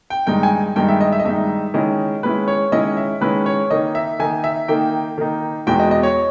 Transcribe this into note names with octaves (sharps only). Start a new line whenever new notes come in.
G5
G2 D#3 G#3 D#4 G5
G#5
G2 D#3 G#3 D#4 G5
E5
D#5
E5
D#5
G2 D#3 G#3 D#4 E5
D#3 G#3 C#4 E4 D#5
D#3 G#3 C#4 E4 B4
C#5
D#3 G#3 C#4 E4 D#5
E5
D#3 G#3 C#4 E4 B4
C#5
D#3 A#3 D#4 D#5
E5
D#3 A#3 D#4 G#5
E5
D#3 A#3 D#4 G5
D#3 A#3 D#4
E2 B2 G#3 B3 E4 G5
D#5
D#5
C#5